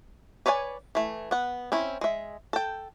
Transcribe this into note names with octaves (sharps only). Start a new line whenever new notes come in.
B4 C#5 D5 F5 G#5
E3 A3
B3 F#5
C4 C#4 E4
G#3 E5
A4 G5